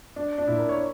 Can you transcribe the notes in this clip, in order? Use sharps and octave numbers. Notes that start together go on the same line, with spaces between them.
D4
D4
A#2 E4
A#4
C#5